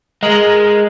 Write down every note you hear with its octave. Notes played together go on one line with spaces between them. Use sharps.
G#3 A#4 D#5